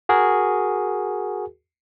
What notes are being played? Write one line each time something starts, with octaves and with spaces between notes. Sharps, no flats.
F#4 G#4 A#4